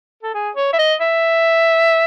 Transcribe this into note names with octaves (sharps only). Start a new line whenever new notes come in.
A4
G#4
C#5
E5
D#5
E5